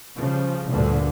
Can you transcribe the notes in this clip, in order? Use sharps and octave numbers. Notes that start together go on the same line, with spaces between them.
C#3 F3 G3
D2 G2 A#2 D3